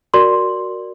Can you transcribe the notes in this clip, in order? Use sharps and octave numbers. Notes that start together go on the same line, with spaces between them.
F#4 A#4 D5 C6